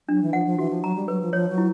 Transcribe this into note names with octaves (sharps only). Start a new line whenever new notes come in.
F#3 D4
E3
F3 F#5
F3
E3 F#4
F3
F#3 A#5
G3
F#3 B4
F3
F3 C#5
F#3
E4